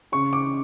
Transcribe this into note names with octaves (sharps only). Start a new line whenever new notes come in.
C#3 C#6
D6